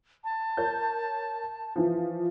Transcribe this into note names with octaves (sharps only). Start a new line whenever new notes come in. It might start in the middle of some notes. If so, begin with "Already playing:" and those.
A5
A#4 C#5 G6
E3 F3